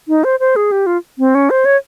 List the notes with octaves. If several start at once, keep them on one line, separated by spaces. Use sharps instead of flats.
D#4
C5
C5
G#4
G4
F4
C4
C#4
C5
C#5